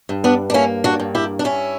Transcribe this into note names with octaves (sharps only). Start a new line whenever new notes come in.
G2
B3 D4
D4
A#3 C#4 E4
D4 F#4
G2
E4 G4
D4
G2 C#4 E4